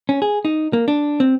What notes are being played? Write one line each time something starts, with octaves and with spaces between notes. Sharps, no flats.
C#4
G#4
D#4
A#3
D4
C4